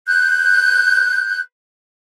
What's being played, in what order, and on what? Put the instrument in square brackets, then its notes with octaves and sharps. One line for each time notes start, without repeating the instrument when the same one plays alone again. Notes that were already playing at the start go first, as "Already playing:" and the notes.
[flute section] F#6 G6